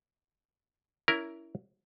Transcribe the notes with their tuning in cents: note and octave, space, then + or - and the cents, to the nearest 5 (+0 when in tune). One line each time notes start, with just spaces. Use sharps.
C#4 +30 E4 +0 A#4 +5